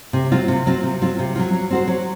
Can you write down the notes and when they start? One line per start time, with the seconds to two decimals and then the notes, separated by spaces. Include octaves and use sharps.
0.13 C3
0.31 F#3 C4 F4
0.48 C3
0.66 F#3 C4 F4
0.83 C3
1.01 F#3 C4 F4
1.19 C3
1.35 F#3 C4 F4
1.53 F#3
1.70 C4 F#4 C5
1.88 F#3